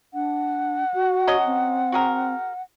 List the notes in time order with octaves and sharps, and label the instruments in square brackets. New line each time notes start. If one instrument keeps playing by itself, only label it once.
[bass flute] D4 [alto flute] F#5
[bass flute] F#4
[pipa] F#3 C#4 D#5
[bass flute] C4
[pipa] F#4 G#4 A#4